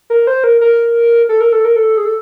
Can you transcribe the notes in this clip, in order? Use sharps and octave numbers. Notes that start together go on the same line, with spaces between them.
A#4
C5
A#4
A#4
A4
A#4
A4
A#4
A4
G#4
A4